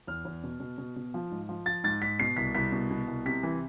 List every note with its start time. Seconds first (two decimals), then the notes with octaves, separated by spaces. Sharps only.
0.07 E2 F6
0.25 E2
0.44 B2
0.60 B2
0.78 B2
0.96 B2
1.14 F3
1.31 G#2
1.49 F3
1.66 F3 A6
1.84 G#2 A6
2.02 G#2 B6
2.19 B2 C7
2.37 C2 B6
2.55 C2 B6
2.72 B2
2.91 B2
3.08 C2
3.25 C3 B6
3.43 E3